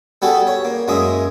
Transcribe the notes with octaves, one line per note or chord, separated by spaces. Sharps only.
G3 B3 F#4 G#4 A4 B4
C#5
A#3
F#2 G#3 A#3 G#4 E5 D#6